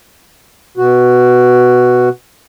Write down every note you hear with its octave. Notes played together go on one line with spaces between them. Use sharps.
B2 F#4